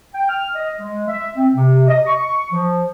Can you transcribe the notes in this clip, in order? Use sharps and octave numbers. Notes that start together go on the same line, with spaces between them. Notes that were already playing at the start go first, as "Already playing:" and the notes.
G5
F6
D#5
G#3
E5
C4
C3
D#5
C#6
F3